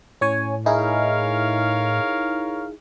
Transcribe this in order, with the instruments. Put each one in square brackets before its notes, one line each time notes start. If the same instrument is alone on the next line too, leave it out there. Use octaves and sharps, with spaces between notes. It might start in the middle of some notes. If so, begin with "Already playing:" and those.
[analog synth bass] A2 [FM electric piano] C#4 C#5 G#5
[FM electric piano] D#4 E4 G#4 [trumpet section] A#4 C#5 F5